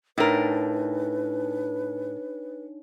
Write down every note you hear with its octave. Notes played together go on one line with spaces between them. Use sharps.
A2 D4 D#4 A#4 B4 C#5